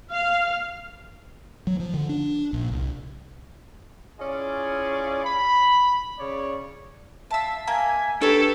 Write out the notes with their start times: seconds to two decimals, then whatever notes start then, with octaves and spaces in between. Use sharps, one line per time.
0.11 F5
1.67 F#3
1.80 F3
1.94 D3
2.09 D4
2.53 A#1
2.72 C2
4.20 C#4 E4 F4 G#4 D5
5.24 B5
6.19 C#3 C#5 D5
7.31 E5 F5 A5 E6
7.67 A#3 E5 G#5 A#5 G#6
8.21 D4 G4 A4 B4 C#5 G5